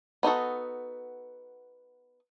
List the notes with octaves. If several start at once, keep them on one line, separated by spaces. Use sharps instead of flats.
B3 D#4 F#4 A4